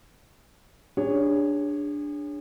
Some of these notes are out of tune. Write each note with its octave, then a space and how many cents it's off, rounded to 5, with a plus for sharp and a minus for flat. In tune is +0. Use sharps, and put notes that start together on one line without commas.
D4 +0 G#4 -35 C#5 +0